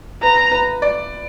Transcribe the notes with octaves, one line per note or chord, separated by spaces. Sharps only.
B4 A#5
B4
D5